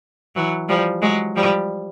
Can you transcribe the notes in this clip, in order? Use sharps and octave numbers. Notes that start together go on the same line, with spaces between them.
E3 F#3
F3 G3
F#3 G#3
F3 G3